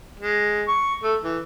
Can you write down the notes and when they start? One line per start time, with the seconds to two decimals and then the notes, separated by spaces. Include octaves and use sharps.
0.20 G#3
0.68 C#6
1.03 A3
1.23 E3